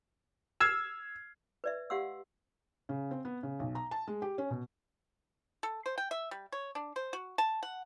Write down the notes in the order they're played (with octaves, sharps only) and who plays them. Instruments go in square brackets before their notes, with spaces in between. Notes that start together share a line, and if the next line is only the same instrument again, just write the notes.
[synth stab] E6 [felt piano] F6 G#6 C7
[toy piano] B4 D5 E5
G4 F5 F#5 C6 E6
[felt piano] C#3
C4
B3
C#3
B1
A#5
A5
G#3
G4
C#4
B2
[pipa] A4
C5
G5
E5
G3
C#5
D4
C5
F#4
A5
F#5